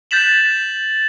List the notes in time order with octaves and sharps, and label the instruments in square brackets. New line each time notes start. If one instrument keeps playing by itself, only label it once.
[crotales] F#6 G6 A6 B6 E7 F#7